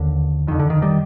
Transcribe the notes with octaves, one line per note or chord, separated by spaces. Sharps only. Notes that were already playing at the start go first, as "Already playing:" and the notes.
Already playing: D#2 D3
F2 D3 D#3
D3
D#3
D#3 G3